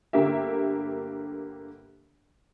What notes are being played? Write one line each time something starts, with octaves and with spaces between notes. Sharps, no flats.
G1 D3 A#3 G4 E5